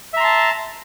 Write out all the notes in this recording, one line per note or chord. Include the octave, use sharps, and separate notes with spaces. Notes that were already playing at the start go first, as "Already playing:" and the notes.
E5 A5 A#5 C6